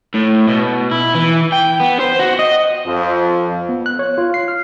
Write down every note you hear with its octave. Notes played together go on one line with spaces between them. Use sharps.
A2
B2
E4
E3
G5
B3
C5
F#4
D#5
F2 F3
B3
F#6
C#5
F4
C7
F6